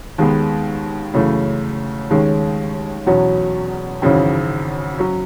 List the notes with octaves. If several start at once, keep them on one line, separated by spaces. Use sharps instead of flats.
D#2 D#3 G#3 B3
F#2 C#3 E3 A3
D#2 D#3 G#3 C#4
E2 B2 F#3 C#4 F#4
G#1 F#2 C#3 E3
F#3 C#4